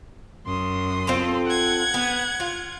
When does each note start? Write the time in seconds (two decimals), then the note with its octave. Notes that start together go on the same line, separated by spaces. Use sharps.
0.45 F#2 C6 D#6
1.07 C4 F4 A4
1.46 F#5 G#6
1.94 B3
2.40 F4